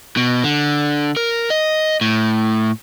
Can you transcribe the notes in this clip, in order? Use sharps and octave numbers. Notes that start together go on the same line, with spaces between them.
B2
D3
A#4
D#5
A2